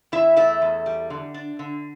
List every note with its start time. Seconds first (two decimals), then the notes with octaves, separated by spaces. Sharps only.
0.12 E2 E4 E5
0.36 A3 E4 E5
0.62 E2
0.86 G3
1.10 D3
1.34 D4
1.59 D3